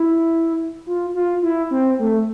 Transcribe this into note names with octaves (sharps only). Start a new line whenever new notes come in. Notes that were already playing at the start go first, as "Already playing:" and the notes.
Already playing: E4
F4
F4
E4
C4
A3